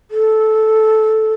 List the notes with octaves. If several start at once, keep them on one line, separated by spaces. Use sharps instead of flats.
A4